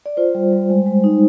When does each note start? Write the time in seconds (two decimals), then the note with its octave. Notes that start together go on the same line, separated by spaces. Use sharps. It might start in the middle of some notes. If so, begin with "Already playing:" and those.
0.06 D5
0.17 F4 C5
0.35 G3
0.52 G3
0.70 G#3
0.86 G#3
1.04 D#4